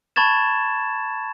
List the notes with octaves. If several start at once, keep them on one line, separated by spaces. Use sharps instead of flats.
A5 B5 C#6 G#6 A6 E7